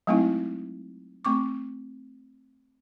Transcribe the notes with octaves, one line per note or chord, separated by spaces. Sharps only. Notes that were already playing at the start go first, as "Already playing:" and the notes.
F#3 G#3 A3 C4 D#4 E4
A3 C4 C#6 D6